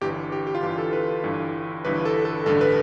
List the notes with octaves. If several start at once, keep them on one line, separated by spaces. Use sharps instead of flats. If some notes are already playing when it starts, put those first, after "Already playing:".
G1 G2 E3 G4
G4
G4
F4
G1 G2 E3 G4
A4
B4
G1 G2 E3
G1 G2 E3 B4
A4
A4
A1 G2 D3 A4
B4